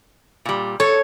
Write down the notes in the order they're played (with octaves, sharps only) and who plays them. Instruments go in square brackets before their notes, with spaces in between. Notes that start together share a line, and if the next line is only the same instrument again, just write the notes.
[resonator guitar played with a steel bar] A#2 G3
[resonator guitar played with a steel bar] A4 [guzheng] C#5